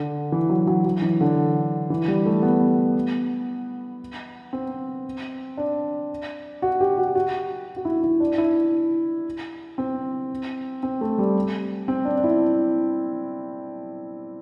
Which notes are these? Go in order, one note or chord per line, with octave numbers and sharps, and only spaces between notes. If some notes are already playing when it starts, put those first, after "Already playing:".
Already playing: D3
E3
F#3
F#3
F#3
E3
D3
E3
G3
A3
B3
C4
D4
F#4
G4
F#4
F#4
F#4
E4
E4
D4
E4
C4
C4
A3
G3
C4
D4
D4
E4